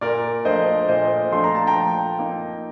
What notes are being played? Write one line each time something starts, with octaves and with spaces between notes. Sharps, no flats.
A#2 A#4 D5
F3 A3 D4 C5 D#5
A#2 C5 D#5
F3 A3 D4 C6
A#5
A5
G5 A#5
F3
A#3 D#4